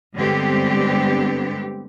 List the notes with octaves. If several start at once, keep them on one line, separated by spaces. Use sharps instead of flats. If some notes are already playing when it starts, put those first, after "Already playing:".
G2 D3 G#3 B3 C4 G4